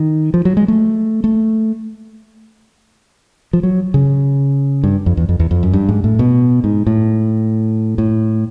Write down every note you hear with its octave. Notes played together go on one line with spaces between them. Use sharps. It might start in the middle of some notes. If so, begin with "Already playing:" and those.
Already playing: D#3
F3
F#3
G#3
A3
A3
F3
F#3
C#3
G2
F2
E2
F2
E2
F2
F#2
G2
G#2
A2
B2
G#2
A2
A2